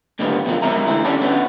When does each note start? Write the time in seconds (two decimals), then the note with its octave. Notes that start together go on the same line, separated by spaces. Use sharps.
0.19 A2 D3 D#3 G3 A#3 B3
0.45 F2 B2 D3 F3 A#3
0.62 D#3 G#3 C4 A#4 E5 A#5
0.86 D2 E3 A3 E4
1.05 C#4 D4 G4 A4
1.20 D3 B3 C#4 F#4